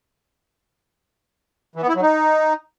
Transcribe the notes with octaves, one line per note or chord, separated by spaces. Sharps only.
E3
B3
E4
F#3
D#4